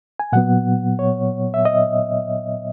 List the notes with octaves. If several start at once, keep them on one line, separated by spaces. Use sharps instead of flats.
G#5
A#2 F#3 B3 F#5
C#5
E5
D#5